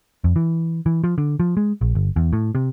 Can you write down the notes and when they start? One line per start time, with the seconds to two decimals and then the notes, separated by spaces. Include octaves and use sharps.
0.24 F2
0.36 E3
0.86 E3
1.04 F3
1.18 D3
1.40 F3
1.57 G#3
1.81 A#1
1.95 G1
2.16 E2
2.33 A2
2.55 C3